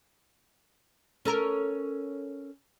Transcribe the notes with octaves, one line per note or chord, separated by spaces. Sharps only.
C#4 A4 A#4